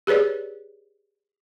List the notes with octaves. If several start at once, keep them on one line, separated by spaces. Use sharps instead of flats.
G4 G#4 B4 C#5 D5